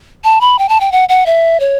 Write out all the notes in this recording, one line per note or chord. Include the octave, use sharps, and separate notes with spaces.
A5
B5
G5
A5
G5
F#5
F#5
E5
C#5